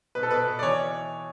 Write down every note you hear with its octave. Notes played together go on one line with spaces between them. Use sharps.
B2 B4
A4
B2 B4
B2
D5
E3 C#5